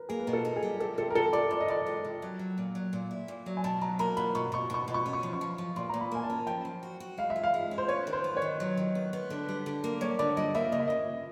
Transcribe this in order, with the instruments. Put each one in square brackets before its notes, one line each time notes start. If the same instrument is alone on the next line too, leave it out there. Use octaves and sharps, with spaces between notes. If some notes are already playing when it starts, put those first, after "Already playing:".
Already playing: [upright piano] A#4 B4
[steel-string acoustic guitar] A#3 [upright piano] G#4
[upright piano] B4
[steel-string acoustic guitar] B2 [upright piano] A#4
[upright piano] A4
[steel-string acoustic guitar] D#4
[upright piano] G#4
[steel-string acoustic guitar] G3
[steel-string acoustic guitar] C3 [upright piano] A4
[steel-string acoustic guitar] C3 [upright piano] A4
[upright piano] A#4
[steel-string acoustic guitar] C3 [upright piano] A4
[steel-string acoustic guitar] C3 [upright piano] D5
[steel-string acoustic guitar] C3 [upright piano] D5
[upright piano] D#5
[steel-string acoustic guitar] C3 [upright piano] D5
[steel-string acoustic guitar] G#3
C3
F#3
F#3
A#2
F#3
A#2
E4
A#2
F#3
[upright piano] G#5
[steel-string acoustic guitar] B2 [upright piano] A5
[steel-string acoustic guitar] F#3 [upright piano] A#5
[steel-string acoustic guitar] A#3 [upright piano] A#5
[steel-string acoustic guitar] B2 [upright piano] B5
[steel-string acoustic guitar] B2 [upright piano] C#6
[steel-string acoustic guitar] B2 [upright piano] C#6
[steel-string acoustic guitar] B2 [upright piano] C#6
[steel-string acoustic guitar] B2
[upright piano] C#6
[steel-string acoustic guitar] C#4
[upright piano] C#6
[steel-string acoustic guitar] F3
[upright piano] C#6
[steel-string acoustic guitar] F3
F3
[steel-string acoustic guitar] A#2 [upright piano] C6
[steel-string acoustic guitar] A#2 [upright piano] A#5
[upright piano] B5
[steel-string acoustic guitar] A#3 [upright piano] G#5
[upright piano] A5
[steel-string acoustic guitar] C#4
[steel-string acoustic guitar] F3 [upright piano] G5
[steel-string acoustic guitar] F3
F#4
F#4
[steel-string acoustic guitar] G#3 [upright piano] F5
[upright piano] E5
[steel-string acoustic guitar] G#3
[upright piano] F5
[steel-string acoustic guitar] G#3
C#4
[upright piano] C5
[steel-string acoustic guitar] B3 [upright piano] C#5
[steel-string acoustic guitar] D#3
[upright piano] C5
[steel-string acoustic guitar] B3
[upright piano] C#5
[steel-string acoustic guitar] D#3
F#3
D#3
B3
B3
D3
G3
D3
A#3
[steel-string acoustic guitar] G3 [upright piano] C#5
[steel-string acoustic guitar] D3 [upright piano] D5
[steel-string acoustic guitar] G3 [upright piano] D#5
[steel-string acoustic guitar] A#3 [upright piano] E5
[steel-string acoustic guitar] C#3 [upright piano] D#5
[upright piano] E5
[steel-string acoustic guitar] C#3 [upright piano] D#5